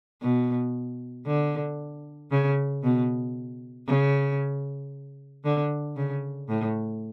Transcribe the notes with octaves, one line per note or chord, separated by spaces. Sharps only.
B2
D3
C#3
B2
C#3
D3
C#3
A2